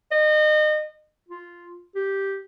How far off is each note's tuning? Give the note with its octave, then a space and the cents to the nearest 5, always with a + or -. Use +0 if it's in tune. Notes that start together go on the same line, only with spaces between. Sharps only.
D#5 -30
F4 -5
G4 -5